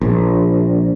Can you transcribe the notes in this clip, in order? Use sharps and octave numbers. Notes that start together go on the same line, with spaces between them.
A#1